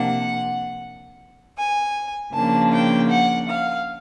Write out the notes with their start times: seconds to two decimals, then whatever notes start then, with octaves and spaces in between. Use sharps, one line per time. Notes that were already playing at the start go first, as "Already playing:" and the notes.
Already playing: C3 F3 A#3 D4 F#5
1.57 G#5
2.33 C#3 F3 A#3 D4 A5
2.72 G5
3.09 F#5
3.48 F5